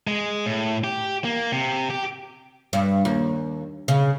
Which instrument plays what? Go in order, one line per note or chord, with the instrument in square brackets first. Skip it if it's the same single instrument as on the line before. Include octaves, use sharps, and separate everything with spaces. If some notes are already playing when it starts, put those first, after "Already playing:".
[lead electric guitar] G#3
A2
G4
A#3
C3
G4
[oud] G2
D#2
C#3